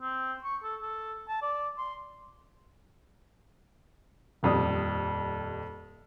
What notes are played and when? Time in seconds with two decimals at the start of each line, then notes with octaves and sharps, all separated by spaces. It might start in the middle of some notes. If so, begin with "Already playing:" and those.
0.01 C4
0.44 C#6
0.63 A4
0.82 A4
1.29 A5
1.42 D5
1.78 C6
4.43 D#1 F2 G3 D#6